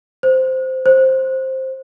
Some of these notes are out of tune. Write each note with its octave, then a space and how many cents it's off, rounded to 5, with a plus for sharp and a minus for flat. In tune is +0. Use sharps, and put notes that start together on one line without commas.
C5 -5
C5 +10